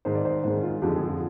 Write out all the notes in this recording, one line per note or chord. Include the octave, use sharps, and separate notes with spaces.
G#2 D#3 G#3 C5
D5
C5
G#2 D#3 G#3 C5
F4
F2 D3 F3 G#3 G4
G#4
F4